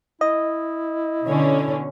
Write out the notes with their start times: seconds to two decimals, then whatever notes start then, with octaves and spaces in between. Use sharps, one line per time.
0.21 E4 D#5
1.25 B2 D3 C#4